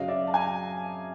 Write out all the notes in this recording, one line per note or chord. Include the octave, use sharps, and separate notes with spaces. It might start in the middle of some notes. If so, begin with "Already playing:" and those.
Already playing: F#2 C#3 F#3 D#5 F5
D5 E5
A5
G#5 A#5